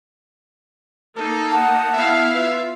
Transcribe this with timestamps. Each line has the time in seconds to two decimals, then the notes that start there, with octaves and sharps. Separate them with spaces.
1.17 A#3 D#4 A4
1.51 F#5 A5
1.93 B3 E4 E5 F5
2.34 F4 B4 E5